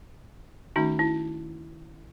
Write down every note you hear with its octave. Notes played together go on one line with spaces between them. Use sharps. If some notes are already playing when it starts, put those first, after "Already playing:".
D#3 A3 C#4 D#4 F#4
E4